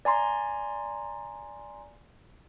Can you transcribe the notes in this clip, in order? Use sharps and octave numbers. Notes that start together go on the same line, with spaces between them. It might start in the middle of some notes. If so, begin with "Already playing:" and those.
D5 G#5 A#5 C6